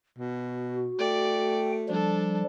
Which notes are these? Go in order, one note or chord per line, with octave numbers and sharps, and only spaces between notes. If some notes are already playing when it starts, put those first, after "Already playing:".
B2 F#4
A3 D5 G5
F3 G3 D4 A4